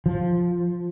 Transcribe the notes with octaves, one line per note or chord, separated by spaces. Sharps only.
F3